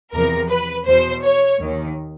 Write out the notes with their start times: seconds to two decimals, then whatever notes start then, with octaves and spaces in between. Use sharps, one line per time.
0.13 E2 C3 F3 A#4
0.50 B4
0.86 E2 B2 C5
1.24 C#5
1.60 D#2 D#3